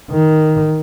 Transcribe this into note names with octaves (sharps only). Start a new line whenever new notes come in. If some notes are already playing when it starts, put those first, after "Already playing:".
D#3